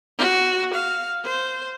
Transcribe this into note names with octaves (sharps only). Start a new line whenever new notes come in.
F#4
F5
C5